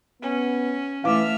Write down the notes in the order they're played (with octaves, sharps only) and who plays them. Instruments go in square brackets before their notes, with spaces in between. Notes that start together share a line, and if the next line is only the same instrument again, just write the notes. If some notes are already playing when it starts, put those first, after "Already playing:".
[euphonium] B3 [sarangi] C#4
[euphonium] E3 [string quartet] A3 E5 F6 [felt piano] F5 D6